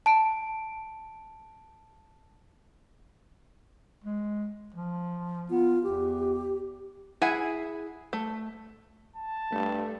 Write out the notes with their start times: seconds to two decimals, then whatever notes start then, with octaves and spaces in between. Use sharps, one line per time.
0.06 A5 D7
4.04 G#3
4.74 F3
5.50 B3 F4
5.83 E2 G4
7.22 E4 G#4 E5 F#5 G#5
8.13 A3
9.16 A5
9.52 G2 A3